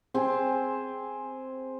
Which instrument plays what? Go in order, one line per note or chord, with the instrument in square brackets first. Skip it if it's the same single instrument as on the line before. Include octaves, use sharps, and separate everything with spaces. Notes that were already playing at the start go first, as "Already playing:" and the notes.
[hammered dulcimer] C4 G#4